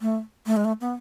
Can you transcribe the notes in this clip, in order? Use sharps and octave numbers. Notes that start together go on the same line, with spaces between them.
A3
A3
G#3
A3
B3